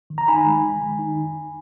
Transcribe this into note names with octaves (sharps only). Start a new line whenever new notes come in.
D#3
A#5
D#4 G#5 B5
G#3
D#3
D#3
D#4